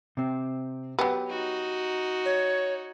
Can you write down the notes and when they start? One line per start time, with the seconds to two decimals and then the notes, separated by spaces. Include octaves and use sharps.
0.17 C3 C4
0.99 F#3 B3 G4 G5
1.29 D#4 F#4
2.25 C#5